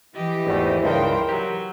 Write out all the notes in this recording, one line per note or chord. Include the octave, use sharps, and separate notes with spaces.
E3 G4 D#5
G#1 E2 A3 C5
C#2 G2 D#4 A#4 C5 G5
F#3 G4